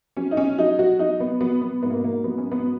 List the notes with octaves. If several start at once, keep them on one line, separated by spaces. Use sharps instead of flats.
F#3 C#4
D#4
C#4
F#3 D#4
F#4
F#3 D#4
B3
F#3 B3
B3
G#2 B3
A#3
A#3
F#3 B3
C#4
B3